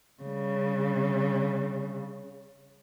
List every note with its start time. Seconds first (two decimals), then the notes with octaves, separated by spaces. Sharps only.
0.23 C#3 G3